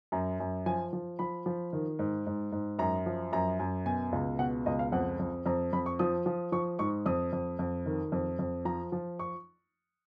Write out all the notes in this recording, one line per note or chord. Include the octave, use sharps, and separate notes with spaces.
F#2 A#5
F#2
F3 G#5
F3
F3 B5
F3
D#3
G#2
G#2
G#2
F#2 A#5
F3
F#2 A#5
F#2
B2 G#5
C#2
B2 F#5
C#2 D#5
F5
F2 F#5
F2
F2 A#5
F2 B5
C#6
F3 D#6
F3
F3 C#6
G#2 C#6
F2 D#6
F2
F2
D#3
F2
F2
F3 A#5
F3
C#6